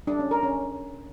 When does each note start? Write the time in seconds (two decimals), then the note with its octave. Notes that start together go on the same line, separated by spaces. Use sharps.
0.07 D4
0.19 C#4
0.31 A#4
0.43 C#4